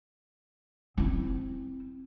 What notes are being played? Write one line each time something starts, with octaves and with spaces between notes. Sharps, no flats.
C4 E4